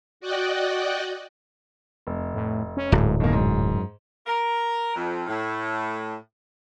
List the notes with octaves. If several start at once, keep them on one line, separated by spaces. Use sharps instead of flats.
F#4 D5 D#5 F#5 G5
F1
A2
C#4
D1 G#2
F#2 B2 D#3 A#3
G#2
A#4
F2
A2